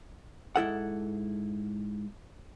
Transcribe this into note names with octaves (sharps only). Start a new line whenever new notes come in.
G#2 E4 A4 F#5